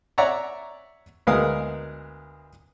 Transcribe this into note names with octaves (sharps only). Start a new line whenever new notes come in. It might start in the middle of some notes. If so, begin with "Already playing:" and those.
C#5 D5 E5 F#5 A#5
D2 G#3 B3 A#4 F5 D#6